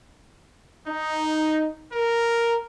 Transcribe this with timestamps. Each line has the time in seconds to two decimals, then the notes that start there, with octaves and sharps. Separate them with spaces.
0.88 D#4
1.93 A#4